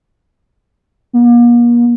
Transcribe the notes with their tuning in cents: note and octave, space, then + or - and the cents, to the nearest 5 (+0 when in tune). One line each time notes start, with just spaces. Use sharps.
A#3 +40